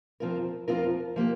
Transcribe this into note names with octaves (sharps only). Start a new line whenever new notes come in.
F2 F3 C4 F4 A#4
F2 F3 C4 F4 A#4
F3 A#3 G4